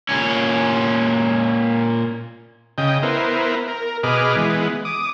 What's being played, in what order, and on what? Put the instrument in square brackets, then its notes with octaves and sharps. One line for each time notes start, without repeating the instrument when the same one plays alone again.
[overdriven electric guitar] A#2 C#4
[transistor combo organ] C#3 D#5 G5
B3 E4 A#4 C5
A#4
B2 G#4 B4 D#5 D6 F6
E3 G#3 B3
D6 D#6